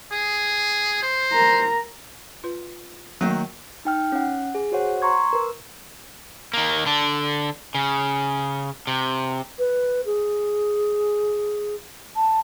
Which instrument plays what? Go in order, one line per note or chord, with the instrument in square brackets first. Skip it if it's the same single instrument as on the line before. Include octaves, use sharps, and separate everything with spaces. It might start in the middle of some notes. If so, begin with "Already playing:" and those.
[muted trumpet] G#4
C5
[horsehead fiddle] A#4 A#5
[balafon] F4 B4
[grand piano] D#3 F#3 [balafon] A3 A#3
[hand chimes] D#4 G5 F6
C#4 F#5
G#4
F#4 C5 C#5 F#5
A#5 C6 C#6 G#6
A#4 B4
[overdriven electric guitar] D#3 A#3
D3 D4
C#3
C3
[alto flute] B4
G#4
A5